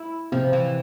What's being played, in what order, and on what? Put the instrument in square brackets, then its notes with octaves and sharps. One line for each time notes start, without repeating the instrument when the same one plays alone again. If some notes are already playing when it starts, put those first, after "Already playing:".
Already playing: [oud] E4
[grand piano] C3 [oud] F3
[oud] E3